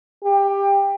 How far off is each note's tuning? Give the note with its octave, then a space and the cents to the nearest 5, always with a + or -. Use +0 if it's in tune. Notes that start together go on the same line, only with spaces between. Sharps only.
G4 +20